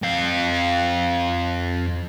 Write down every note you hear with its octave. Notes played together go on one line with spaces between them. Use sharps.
F2 F5